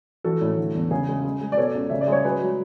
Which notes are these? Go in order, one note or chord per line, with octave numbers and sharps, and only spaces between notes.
E3 F#4 A4
A2
D3
E2
C#3 G#4
G#3
G#3
G#3
D5
B2 A4 C#5
C#2
C#3 E5
D5
G#3 C#5
F#3 G#4 B4
F#3